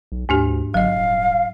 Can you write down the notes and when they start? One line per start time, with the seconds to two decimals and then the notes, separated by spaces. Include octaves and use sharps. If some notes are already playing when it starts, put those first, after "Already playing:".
0.12 B1
0.29 D2 G#2 D4 G4
0.74 G1 F#3 D#5 F5
0.96 D#1